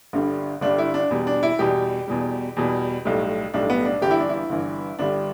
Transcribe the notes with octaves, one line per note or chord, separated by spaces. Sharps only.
G1 G2 D3 G3
G1 G2 D3 G3 D4
E4
D4
E2 B2 G3
D4
E4
E2 B2 G3 G4
E2 B2 G3
E2 B2 G3
B1 A2 G3
B1 A2 G3 D4
B3
D4
G1 G2 E3 G4
E4
D4
E4
G1 G2 E3
G1 G2 D3 G3 D4